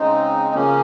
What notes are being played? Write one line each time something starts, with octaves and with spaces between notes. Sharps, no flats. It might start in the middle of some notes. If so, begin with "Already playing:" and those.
Already playing: C#3 G#3 C4 D#4
C#3 F3 A#3 C#4